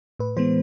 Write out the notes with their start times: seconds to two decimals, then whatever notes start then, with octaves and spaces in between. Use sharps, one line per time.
0.19 A2 B4
0.37 E3 G#3 B3 C5